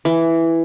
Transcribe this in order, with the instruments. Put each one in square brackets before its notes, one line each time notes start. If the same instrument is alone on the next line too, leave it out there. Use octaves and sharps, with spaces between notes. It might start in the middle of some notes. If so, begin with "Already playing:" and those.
[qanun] E3